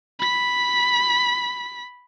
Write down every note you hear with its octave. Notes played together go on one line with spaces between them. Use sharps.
B5 B6